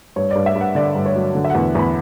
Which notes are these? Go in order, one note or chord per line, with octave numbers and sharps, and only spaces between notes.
G2 C#5
G2 D5
E5
G2
F#5
D3 D5
G2
C#5
F#3
D3
E5
E2 F#5
E2 B5